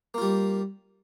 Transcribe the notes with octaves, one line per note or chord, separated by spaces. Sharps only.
G3 A#3 F4